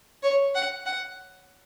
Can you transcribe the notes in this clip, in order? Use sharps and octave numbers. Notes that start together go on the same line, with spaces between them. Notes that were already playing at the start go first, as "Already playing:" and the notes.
C#5
F#5
F#5